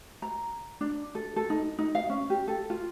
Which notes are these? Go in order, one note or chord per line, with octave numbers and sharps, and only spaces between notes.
A#5
D4
A4
A4
D#4
D#4
F5
C#4
G4
A4
F4